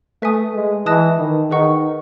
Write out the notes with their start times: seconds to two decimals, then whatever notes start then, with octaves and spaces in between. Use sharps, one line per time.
0.22 A3 B4 E5 G#5 D#6
0.54 G#3
0.86 E3 D#5 A5 D#6 F#6
1.19 D#3
1.51 D#3 G#4 B4 D#5 F#5 C#6